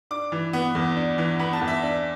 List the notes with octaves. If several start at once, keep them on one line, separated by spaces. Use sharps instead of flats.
D4 D6
E3
B3
E2
D4
E3
B3 B5
A5
E2
E5
D4